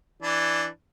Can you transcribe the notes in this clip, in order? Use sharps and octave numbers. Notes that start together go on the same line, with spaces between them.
E3 D4